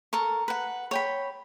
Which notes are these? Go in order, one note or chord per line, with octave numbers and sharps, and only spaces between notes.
A4 A#4 C#6
B4 F#5
C#5 G5 B5